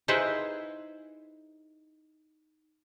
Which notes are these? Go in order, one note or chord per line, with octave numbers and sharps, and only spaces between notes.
D#4 E4 G#4 B4 C5